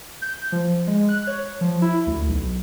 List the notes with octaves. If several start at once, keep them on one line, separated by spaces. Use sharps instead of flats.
G6
F3
G#3
F#6
C#5
F3
E4
D2
B1